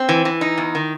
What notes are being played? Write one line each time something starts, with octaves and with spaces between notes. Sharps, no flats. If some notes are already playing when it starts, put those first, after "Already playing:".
Already playing: C4
E3
E3
D#4
E2
D#3